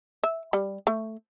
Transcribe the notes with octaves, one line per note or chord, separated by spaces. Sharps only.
E5
G3
A3